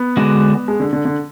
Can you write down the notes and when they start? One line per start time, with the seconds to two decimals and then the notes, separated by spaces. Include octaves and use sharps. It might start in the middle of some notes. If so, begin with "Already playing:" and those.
Already playing: B3
0.17 D3 G#3 D4 F#4
0.68 G#3
0.80 D3
0.93 D3
1.05 D3